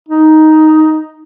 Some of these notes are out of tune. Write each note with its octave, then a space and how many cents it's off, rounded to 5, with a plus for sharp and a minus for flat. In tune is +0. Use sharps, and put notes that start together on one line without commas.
D#4 +5